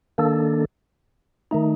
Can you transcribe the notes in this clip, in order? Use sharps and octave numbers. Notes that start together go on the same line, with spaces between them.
D#3 A#3 D4 A4
D#3 A3 D#4